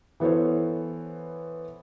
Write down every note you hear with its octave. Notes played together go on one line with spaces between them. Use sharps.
E3 B3 A4 C5 C#5